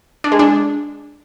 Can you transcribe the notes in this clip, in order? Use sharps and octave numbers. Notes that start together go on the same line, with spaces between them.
D4
G#3
D4